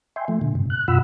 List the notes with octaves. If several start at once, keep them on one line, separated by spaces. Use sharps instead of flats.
E5 G5 G#5 C6
F3 A3
A#2 D3
G2 C3
F#6
F#2 B2 F4 F#5 B5 E6